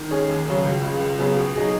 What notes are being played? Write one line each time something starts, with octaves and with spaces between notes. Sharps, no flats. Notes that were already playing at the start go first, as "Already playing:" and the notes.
Already playing: D#3
G#3 C#4 G#4
D#2
C#3 F#3 C#4 G#4
C#2
C#3 G#3
C#2
C#3 F#3 B3 G#4
B2
F#3 D#4 G#4